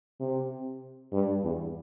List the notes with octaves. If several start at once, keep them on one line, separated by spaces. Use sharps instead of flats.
C3
G2
E2